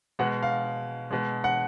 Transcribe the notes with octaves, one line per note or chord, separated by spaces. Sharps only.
B2 G#3 F#5
F5
B2 G#3
F#5